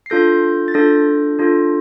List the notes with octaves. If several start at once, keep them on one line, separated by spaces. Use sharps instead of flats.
C7
D4 F4 A4 G6 A#6
A6
D4 F4 A4 G6 A#6
D4 F4 A4